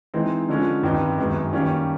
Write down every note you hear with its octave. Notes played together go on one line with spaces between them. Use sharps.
E3 G#3 C4 D#4
D3 F3 G#3 C#4
G2 D#3 G3 C4 D#4
F#2 D#3 G#3 B3
D#3 G3 A#3 C#4